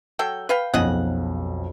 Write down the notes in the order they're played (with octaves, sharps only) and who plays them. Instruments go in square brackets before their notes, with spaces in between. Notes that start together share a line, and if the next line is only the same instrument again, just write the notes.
[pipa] F#3 A4 G5
B4 F5 G5
[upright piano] B1 F2 [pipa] C#3 D#5 F#5